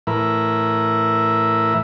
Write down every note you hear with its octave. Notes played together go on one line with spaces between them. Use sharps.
A2 E3 E4 A#4 B4